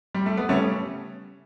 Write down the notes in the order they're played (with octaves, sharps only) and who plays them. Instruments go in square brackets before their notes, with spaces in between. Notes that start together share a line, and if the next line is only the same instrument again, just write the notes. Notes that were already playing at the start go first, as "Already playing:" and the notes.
[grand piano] G3
A3
B3
C#3 G3 A3 C#4